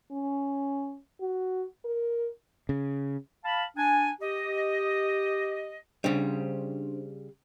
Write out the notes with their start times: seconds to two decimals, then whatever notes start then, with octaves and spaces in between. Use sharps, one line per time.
0.11 C#4
1.21 F#4
1.85 A#4
2.69 C#3
3.45 F5 A5 B5
3.77 D4 G#5
4.21 G4 D#5
6.04 C#3 G3 D4 C5